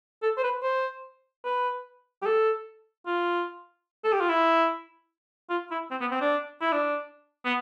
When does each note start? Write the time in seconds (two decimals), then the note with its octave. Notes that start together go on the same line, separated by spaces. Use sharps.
0.22 A4
0.37 C5
0.43 B4
0.63 C5
1.45 B4
2.22 G4
2.25 A4
3.06 F4
4.04 A4
4.12 G4
4.20 F4
4.29 E4
5.50 F4
5.71 E4
5.91 C4
6.01 B3
6.11 C4
6.21 D4
6.61 E4
6.72 D4
7.45 B3